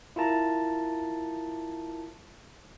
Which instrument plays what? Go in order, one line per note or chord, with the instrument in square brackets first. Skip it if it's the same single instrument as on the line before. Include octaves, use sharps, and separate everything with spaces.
[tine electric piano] E4 F4 A#4 A5 A#5